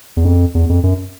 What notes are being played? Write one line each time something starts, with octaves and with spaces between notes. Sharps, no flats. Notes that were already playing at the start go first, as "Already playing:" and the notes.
E2
F2
E2
F2
F#2